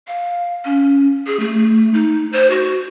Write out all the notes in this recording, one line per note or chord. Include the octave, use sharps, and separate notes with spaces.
F5
C#4
G#4
A3
D#4
C5
F#4